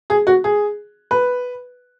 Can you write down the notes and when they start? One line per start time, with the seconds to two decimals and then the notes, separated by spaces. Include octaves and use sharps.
0.10 G#4
0.27 F#4
0.44 G#4
1.11 B4